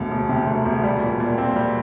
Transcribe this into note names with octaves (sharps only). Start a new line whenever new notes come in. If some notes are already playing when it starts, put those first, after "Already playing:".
Already playing: E1 D2
E1
C3
D2
E1
G3
A#2
A#2
C4
G3